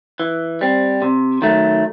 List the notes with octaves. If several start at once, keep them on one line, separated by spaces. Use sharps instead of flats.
E3
G3 C4
C3
D#3 F#3 A3